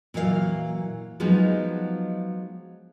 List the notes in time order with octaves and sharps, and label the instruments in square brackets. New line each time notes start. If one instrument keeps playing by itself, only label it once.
[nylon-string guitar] A#2 E3 F#3 D5 F5
F3 F#3 G#3 B3 D#4